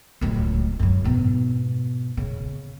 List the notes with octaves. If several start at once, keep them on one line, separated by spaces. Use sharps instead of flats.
D1 C#2
F#2 F#3
G#2 B2
C#3